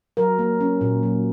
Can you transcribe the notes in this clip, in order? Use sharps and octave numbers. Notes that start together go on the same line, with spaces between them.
F#3 A#4
A#3
C#4
A#2
F#3